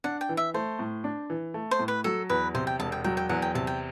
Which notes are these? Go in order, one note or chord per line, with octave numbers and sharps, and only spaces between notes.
D4 F#5
G5
E3
E5
A3 C5
A2
D4
E3
A3
C5
A2
B4
F#3 A4
E2 B4
C3 C5
G5
E1 A5
G5
F#3 G5
G5
E2 F#5
G5
C3 A5
G5